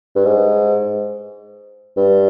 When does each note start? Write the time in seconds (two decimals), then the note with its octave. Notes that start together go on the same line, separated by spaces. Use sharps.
0.15 G2
0.25 G#2
1.97 G2